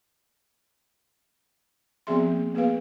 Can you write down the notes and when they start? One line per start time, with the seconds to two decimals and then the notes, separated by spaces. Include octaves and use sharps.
2.07 F3 B3 C4 G#4 E5 C6
2.31 A#3
2.54 A#3 B3 G#4 B4 F5